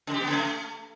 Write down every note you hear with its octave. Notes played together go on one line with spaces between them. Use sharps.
C#3
G4
B3
C#3
A3